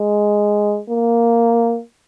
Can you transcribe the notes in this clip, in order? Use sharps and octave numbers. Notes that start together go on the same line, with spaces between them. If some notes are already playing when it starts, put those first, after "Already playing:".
Already playing: G#3
A#3